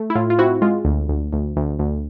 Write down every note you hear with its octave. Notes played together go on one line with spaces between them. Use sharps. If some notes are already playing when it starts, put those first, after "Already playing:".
Already playing: A3
E4
A2 F4
F4
C4 E4 F#4
G#3 F4
D2
D2
D2
D2
D2